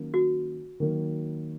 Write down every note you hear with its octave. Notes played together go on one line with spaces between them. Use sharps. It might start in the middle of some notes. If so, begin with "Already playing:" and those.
Already playing: D#3 F#3 A#3 C#4
F#4
D#3 F#3 A#3